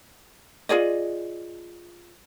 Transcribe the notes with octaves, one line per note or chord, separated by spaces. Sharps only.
F4 G#4 D5 D#5